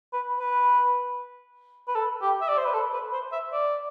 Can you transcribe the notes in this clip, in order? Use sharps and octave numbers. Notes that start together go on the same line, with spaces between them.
B4
B4
B4
A4
G4
E5
D5
C5
B4
A4
B4
C5
E5
D5